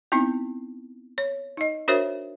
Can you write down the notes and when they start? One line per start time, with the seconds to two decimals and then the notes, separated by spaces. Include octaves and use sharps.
0.12 B3 C4 D#4 E4
1.18 C#5
1.57 D#4 D#5
1.88 D4 F#4 A#4 C5 C#5 E5